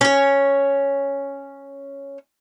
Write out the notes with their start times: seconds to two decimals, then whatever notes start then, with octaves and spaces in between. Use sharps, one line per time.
0.01 C#4 C#5